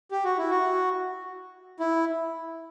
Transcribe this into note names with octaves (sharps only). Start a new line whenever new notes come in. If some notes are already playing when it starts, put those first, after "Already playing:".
G4
F#4
E4
F#4
E4